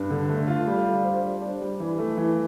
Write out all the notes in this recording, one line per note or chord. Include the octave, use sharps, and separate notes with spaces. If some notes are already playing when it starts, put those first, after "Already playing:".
Already playing: G2
D3
A3
F4
G3
D4
C5
G3
D4
G3
E3
A3
E3